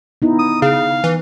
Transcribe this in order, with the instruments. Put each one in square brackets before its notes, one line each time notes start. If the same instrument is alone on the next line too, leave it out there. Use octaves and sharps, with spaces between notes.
[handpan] B3 D#4 E4
[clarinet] D#6
[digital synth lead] C#3 [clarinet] F5
[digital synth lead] E3